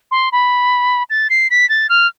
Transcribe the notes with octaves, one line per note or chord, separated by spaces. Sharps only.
C6
B5
A6
C7
B6
A6
F6